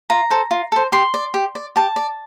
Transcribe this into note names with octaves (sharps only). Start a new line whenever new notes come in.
F4 A#5
A4 C5
F4
A4 C5
G4 C6
D5
G4
D5
G4 A5
D5